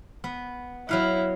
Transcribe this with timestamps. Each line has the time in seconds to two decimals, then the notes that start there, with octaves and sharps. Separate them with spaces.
0.24 B3
0.89 F#3 E4 F5 F#5